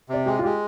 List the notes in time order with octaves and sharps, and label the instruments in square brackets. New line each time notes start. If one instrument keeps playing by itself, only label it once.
[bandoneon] C3 [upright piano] D5
[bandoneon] G#3 [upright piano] G4
[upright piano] F4
[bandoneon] G#3 [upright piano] G4